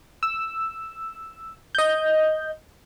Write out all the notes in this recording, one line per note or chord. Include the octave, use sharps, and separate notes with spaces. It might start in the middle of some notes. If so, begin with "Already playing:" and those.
E6
D#5 G6